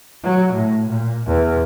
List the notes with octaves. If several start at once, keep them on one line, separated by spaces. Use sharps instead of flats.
F#3
A2
A#2
E2